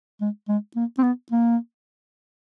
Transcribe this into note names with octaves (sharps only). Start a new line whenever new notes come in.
G#3
G#3
A#3
C4
B3
A#3